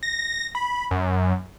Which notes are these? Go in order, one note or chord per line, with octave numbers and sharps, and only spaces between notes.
A#6
B5
F#2